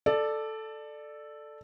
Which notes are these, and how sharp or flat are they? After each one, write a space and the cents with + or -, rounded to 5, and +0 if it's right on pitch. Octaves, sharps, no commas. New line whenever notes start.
A4 +0 D5 +15